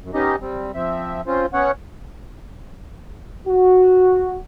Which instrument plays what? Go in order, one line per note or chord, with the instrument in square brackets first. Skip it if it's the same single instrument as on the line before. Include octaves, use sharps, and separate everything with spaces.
[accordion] F#2
B3 C#4 D#4 G4 D#5
G3 C4
F3 C4 E5
C4 C#4 F4 C5
B3 C#4 C#5 F#5
[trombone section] F#4